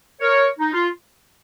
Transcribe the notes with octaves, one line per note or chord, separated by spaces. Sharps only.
A#4 C#5
D#4
F4